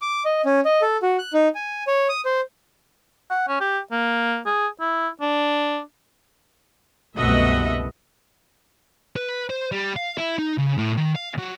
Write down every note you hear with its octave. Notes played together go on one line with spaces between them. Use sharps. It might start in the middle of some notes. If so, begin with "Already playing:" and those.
D6
D#5
C#4
D#5
A4
F#4
F#6
D#4
G#5
C#5
D#6
C5
F#5
C#4
G4
A#3
G#4
E4
D4
F#1 C2 B2 A3 B3 D#5 E5 F#5
B4
C5
G3
F5
E4
D#4
C#3
A2
D#3
F5
F#3